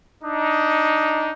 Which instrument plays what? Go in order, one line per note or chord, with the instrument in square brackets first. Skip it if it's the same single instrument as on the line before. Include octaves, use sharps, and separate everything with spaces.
[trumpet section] D4 D#4